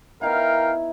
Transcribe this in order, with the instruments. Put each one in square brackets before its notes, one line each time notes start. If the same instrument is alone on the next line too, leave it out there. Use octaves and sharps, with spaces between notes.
[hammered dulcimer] B3 D#4 E4 [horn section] A#4 F5 G5